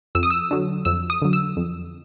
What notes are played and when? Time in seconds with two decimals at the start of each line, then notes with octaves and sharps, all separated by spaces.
0.15 F2 E6
0.23 D#6
0.30 E6
0.51 D3 F#3
0.85 F2 E6
1.10 D#6
1.22 D3 F#3
1.33 E6
1.57 F2